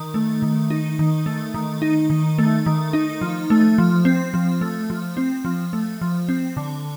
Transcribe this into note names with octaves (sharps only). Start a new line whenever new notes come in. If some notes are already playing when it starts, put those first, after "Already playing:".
Already playing: D#3
A3
D#3
D#4
D#3
A3
D#3
D#4
D#3
A3
D#3
D#4
F3
A3
F3
C4
F3
A3
F3
C4
F3
A3
F3
C4
D3